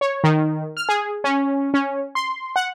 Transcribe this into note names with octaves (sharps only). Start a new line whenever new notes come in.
C#5
D#3
F6
G#4
C#4
C#4
C6
F#5